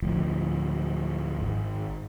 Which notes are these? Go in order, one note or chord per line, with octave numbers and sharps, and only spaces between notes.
D2 A2 F3
G#1